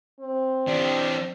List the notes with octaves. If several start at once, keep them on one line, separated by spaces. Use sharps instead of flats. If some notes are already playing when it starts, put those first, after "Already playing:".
C4
E3 D4 G4 D5